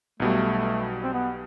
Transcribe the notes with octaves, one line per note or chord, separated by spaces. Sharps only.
B1 B2 G3 A3
C4
B3